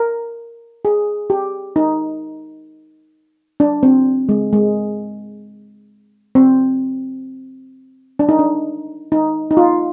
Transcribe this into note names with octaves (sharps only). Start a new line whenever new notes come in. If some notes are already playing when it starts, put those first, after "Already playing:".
Already playing: A#4
G#4
G4
D#4
D4
C4
G#3
G#3
C4
D4
D#4
D4
D#4
D#4
F4